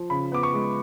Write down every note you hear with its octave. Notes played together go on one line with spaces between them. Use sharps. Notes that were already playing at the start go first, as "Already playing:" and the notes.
Already playing: F3
C#3 B5
B3 D6
C#6
G#3